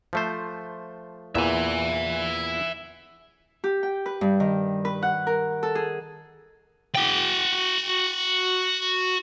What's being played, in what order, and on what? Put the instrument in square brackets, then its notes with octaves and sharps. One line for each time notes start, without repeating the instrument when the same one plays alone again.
[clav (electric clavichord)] F3 A3 C5
[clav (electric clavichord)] E2 A#2 E3 [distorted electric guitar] E5 G#5
[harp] G4
G5
B4
G2
D#3
B4
F#5
A#4
A4
G#4
[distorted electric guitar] F#4 G5